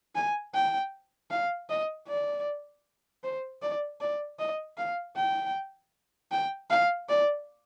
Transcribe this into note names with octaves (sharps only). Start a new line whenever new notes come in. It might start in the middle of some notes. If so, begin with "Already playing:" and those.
G#5
G5
F5
D#5
D5
C5
D5
D5
D#5
F5
G5
G5
F5
D5